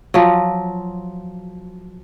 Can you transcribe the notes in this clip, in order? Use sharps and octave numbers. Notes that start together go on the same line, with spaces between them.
F3 F#3